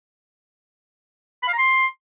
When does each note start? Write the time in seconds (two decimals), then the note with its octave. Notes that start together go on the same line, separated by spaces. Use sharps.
1.43 B5
1.48 F5
1.53 A#5
1.58 C6